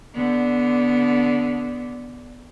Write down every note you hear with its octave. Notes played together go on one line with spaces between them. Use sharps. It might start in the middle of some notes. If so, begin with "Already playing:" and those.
D3 B3